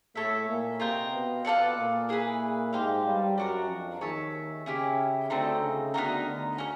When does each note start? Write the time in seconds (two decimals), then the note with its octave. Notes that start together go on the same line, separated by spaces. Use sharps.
0.15 A2 A3 E4 A4 C#5 E5
0.48 A#2 A#3
0.80 C3 C4 F4 A#4 D#5 G5
1.12 B2 B3
1.44 B2 B3 F4 A4 D5 F#5
1.76 A#2 A#3
2.09 E4 G#4 B4
2.73 G#2 G#3 D#4 G4 C5 F5
3.05 G2 G3
3.37 F#2 F#3 D4 F#4 A#4
3.69 F2 F3
4.01 D#2 D#3 G#4 C#5 E5 A5
4.66 C#3 C#4 E4 G4
5.30 D2 D3 A3 C4 D#4
5.62 C#3
5.94 D2 D3 B3 D#4 F#4 A#4
6.26 D2 D3
6.58 C#4 F#4 A#4